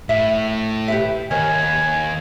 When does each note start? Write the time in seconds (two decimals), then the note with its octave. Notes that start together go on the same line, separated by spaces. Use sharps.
0.09 A2 E5
0.88 G4 B4 E5
1.31 D#2 A#4 C#5 D#5 G#5
1.63 B4